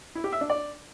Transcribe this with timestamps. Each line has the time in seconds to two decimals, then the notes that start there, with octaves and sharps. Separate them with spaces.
0.15 E4
0.24 G4
0.32 E5
0.41 D4
0.50 D5